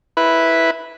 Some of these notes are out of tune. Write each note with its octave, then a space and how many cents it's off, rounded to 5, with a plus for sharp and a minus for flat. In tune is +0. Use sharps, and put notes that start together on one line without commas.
E4 -5 B4 +0